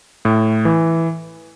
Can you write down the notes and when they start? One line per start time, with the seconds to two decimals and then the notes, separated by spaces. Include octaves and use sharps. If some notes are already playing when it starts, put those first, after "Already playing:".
0.25 A2
0.65 E3